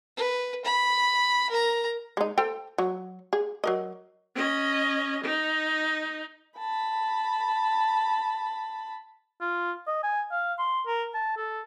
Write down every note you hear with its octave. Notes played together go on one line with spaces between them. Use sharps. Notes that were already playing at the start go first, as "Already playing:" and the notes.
B4
B5
A#4 A#5
G#3 D#4
A4 C5 G5
F#3
G#4
F#3 A#4 D#5
C#4 D#5
D#4
A5 B5
F4
D#5
G#5
F5
C6
A#4
A5
A4